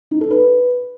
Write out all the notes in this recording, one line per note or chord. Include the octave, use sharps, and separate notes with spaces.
D#4
A4
B4